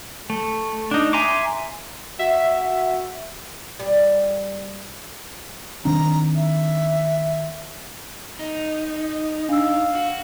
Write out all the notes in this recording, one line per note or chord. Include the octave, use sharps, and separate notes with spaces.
A3
D4 D#4
E5 G#5 A#5 C6 D6
F#4 E5
G3
D#3 C4 D4 A#5
E5
D#4
D4 F5 E6
F#4